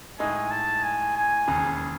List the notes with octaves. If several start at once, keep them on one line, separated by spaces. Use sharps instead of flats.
A2 G#3 D#4 G#5
A5
G#5
G#5
E1 D#2 C#3